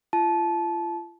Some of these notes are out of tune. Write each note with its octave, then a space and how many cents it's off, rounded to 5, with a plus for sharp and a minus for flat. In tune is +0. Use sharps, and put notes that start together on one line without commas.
F4 -35 A5 -20